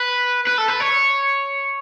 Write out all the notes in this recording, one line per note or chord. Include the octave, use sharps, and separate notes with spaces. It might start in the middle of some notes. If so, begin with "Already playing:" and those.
Already playing: B4
B4
A4
B4
C#5